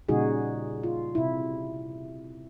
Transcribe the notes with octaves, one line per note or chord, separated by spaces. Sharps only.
A#2 C#3 G3 D#4 F#4 G#4
F4
C3 E4